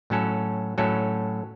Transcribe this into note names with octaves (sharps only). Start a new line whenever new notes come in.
A2 F#3 C#4 A4
A2 F#3 C#4 A4